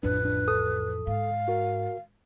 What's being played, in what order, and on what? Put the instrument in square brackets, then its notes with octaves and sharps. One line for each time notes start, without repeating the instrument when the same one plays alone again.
[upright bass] A1 F2 [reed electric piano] D4 [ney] B4
[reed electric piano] D4
C2 A4 D#6
[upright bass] G#2 [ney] F5
[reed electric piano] F#4 A#4